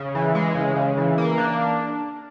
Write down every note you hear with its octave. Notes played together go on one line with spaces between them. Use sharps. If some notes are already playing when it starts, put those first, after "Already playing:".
Already playing: C#3
E3
G#3
C#3
C#3
E3
A#3
D4